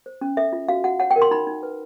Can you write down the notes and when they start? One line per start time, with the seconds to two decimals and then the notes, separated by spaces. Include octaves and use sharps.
0.06 C5
0.21 C#4
0.37 A4 E5
0.53 F4
0.68 F#4 F5
0.84 F#4 F#5
1.00 C#5 F#5
1.11 G5
1.16 A#4
1.22 C6
1.31 D#4 B5
1.47 D#4
1.63 B4